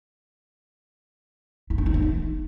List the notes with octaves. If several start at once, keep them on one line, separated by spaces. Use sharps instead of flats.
E4
D4
D#4
A3
D#4